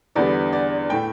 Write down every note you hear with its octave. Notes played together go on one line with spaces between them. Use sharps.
E2 D3 G3 B3 D5
D5
A2 A3 G5